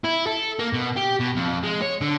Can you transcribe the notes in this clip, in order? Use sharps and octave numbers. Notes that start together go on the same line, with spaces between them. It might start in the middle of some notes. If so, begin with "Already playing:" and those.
E4
A4
A#3
B2
G4
B2
F2
G#3
C#5
D3